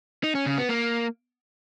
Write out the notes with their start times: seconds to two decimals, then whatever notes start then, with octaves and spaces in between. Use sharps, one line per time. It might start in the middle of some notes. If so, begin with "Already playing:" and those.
0.24 D#4
0.35 C#4
0.46 C#3
0.58 B3
0.69 A#3